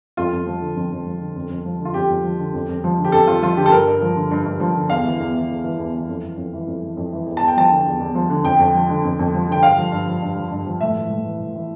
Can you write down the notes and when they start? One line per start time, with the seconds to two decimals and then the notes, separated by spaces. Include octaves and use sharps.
0.17 F2 F4
0.33 F2
0.46 F3
0.61 D3
0.76 F2
0.91 F2
1.05 F3
1.21 D3
1.36 F2
1.50 F2
1.65 F3
1.80 D3
1.85 F4
1.94 F2 G4
2.09 F2
2.24 F3
2.39 D3
2.54 F2
2.69 F2
2.84 F3
2.98 D3
3.05 G4
3.12 F2 A4
3.27 F2 F4
3.42 F3 F4
3.57 D3 G4
3.66 A4
3.72 G2 A#4
3.87 G2
4.02 F3
4.16 D3
4.31 G2
4.46 G2
4.60 F3
4.75 D3
4.90 E2 F5
5.04 E3
5.20 E2
5.34 E3
5.50 E2
5.64 E3
5.79 E2
5.94 E3
6.09 F2
6.23 E3
6.37 F2
6.53 E3
6.67 F2
6.82 E3
6.97 F2
7.12 E3
7.26 E2
7.37 E2 A5
7.48 G5
7.57 F3 A5
7.70 D3
7.86 E2
8.00 E2
8.15 F3
8.30 D3
8.44 F2 G5
8.59 F2
8.74 F3
8.89 D3
9.04 F2
9.19 F2
9.34 F3
9.48 D3 G5
9.62 G2 F5
9.78 F3
9.92 G2
10.07 F3
10.22 G2
10.36 F3
10.51 G2
10.66 F3
10.81 A2 E5
10.96 E3
11.10 A2
11.25 E3
11.40 A2
11.56 E3